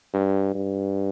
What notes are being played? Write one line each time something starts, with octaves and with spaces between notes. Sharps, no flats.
G2
G2